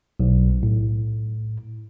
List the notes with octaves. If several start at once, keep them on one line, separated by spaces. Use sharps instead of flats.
B1
A2